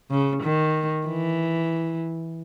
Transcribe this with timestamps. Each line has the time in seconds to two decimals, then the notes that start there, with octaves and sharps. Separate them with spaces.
0.10 C#3
0.43 D#3
1.07 E3